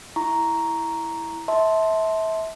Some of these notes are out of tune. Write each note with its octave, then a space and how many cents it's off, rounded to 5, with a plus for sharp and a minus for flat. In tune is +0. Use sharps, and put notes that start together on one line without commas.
E4 +0 A#5 +0 C#6 +0
E5 -30 A5 +0 C6 +0